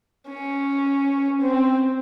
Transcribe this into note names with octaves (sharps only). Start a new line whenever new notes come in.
C#4
C4